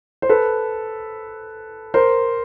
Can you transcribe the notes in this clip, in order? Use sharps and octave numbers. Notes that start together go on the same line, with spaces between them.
C5
A4 B4
A#4 C5